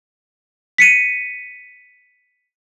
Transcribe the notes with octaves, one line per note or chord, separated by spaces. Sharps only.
B6 C#7 D#7